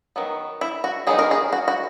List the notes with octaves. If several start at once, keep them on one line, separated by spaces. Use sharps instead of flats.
D#3 F#3 B3
E4
F#4
D#3 F#3 B3 D#4 G#4
A#4
G#4
F#4
F#4